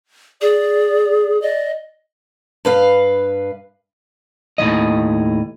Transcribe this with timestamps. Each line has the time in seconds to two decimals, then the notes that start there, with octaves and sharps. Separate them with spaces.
0.41 G#4 D5
1.42 D5 D#5
2.65 G2 B4 F5
4.58 D#2 A2 F3 D#5